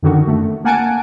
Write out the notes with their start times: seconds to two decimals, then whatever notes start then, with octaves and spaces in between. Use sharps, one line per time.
0.03 F#2 D3 D#3 F#4
0.28 A3
0.64 A#3 F#5 G#5 A5 D7